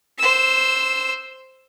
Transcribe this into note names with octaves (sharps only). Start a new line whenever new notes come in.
C5 E6